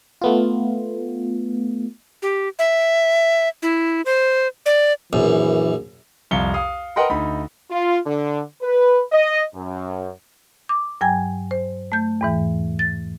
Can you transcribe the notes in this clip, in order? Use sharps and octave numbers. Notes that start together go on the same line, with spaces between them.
A3 B3 F4
G4
E5
E4
C5
D5
A#1 F#2 E3
C2 F2 F5 C#7 G7
F5 D#6
A#4 B4 D#5 F#5 G5 C6
D2 D#4 B5
F4
D3
B4
D#5
F#2
D6
G2 F#3 G5 G#5 G#6
C5
A3 G6
E2 G#2 E3
A6